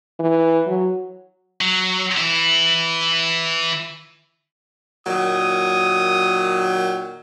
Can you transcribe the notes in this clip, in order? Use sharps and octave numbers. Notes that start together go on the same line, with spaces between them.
E3
F#3
F#3
E3 E4
A#2 D#3 F#3 D#6